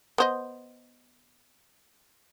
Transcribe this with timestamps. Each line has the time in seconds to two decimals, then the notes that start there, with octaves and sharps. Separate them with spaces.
0.18 B3 C5 D#5